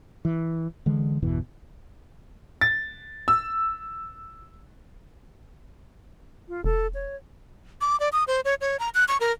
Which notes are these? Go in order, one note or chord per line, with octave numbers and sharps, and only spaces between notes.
E3
D3 E3 G#3
G1 E2 B2 E3
A6
E6
F4
E1 A4
C#5
D6
D5
D#6
C5
C#5
C#5
A#5
F#6
C#6
A#4